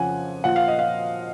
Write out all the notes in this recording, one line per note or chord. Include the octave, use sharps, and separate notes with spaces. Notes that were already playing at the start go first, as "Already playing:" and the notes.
Already playing: F2 C#3 F3 F#5 G#5
A#2 F3 F#5
F5
D#5
F5